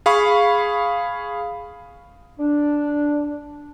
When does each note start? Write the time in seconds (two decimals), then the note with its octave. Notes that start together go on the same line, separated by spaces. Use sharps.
0.06 G#4 F5 B5 C#6
2.39 D4